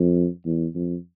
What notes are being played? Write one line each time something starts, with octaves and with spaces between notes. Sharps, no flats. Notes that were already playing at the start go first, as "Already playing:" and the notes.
Already playing: F2
E2
F2